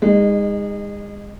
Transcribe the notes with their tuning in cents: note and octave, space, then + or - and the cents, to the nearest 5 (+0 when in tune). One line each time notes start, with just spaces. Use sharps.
G#3 -30 D#4 +0